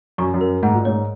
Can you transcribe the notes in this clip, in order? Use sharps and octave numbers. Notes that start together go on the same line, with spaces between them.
F#2 C#6
F#2
A#4
G#2 F#5
A#2
G#2 C#5